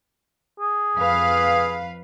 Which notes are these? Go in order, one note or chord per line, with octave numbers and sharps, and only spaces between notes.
G#4
F2 B4 F5